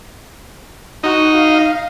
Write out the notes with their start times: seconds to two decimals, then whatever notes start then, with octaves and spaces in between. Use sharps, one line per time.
1.03 D#4 F#4
1.36 F5